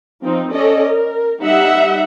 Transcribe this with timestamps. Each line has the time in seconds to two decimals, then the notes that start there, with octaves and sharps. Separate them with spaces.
0.22 F3 C4 D#4
0.51 C#4 A4 D5 D#5
0.90 A#4
1.41 G3 D#4 E5 F#5